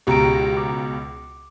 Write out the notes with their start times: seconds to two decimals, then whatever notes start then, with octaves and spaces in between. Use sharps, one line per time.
0.07 C#2 B2 G4 A#5 D7
0.57 D6